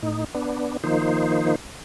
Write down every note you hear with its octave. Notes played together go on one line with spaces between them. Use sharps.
A2 D#4
B3 D4
D#3 F3 A#3 D#4 C5